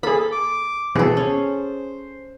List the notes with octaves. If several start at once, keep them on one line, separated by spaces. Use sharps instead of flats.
A#3 G#4 A4 B5
D6
B2 E3 B3 G#4 A4 C5
C#4